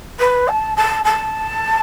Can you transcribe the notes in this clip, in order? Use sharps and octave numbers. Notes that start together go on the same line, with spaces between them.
B4
A5
A5
A5